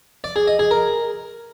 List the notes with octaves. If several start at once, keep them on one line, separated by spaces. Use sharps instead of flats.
D5
G#4
D#5
G#4
A#4